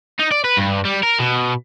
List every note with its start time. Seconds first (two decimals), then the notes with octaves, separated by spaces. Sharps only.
0.20 D#4
0.32 D5
0.44 B4
0.57 G2
0.85 G3
1.03 A#4
1.19 B2